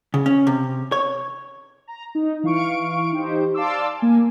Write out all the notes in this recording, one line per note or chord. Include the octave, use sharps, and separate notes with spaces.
C#3
C#4
C3
C#5
A#5
D#4
E3 F5 C#6 D7
D#4 G4 C5
D5 F5 A5 C6 D6 E6
A#3 G#5